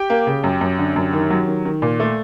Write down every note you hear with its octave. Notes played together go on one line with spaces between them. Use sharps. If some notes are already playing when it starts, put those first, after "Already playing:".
Already playing: G4 G5
A#3
C#3
F#2
F#2
D3
F#2
D#3
F#3
D#3
D#3
A#2
A3